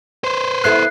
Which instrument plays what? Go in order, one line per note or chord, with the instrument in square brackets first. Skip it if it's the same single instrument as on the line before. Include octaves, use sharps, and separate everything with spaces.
[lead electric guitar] B4 C5
[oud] B3 E4 A4 [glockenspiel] F#6 C7